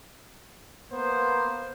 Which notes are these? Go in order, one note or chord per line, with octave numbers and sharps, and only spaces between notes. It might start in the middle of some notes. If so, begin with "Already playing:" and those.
A#3 B3 C5